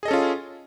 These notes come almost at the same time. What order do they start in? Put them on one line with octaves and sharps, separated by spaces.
G#4 D#5 A4 C#4 F4